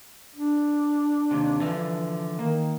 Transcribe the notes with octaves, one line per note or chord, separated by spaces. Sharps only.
D4
D#2 C3
D3 E3 F3
D#3 A#3